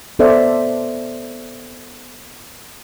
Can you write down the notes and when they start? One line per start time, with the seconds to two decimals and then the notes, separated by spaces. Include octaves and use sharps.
0.19 B3 A4 C5 D5 E5